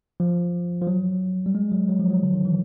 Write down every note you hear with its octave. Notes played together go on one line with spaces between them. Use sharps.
F3
F3
F#3
G3
G#3
F#3
F#3
F3
F#3
D3
D#3
E3